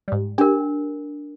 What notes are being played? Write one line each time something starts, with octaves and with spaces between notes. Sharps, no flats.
G#2 G3
D4 G4 A#4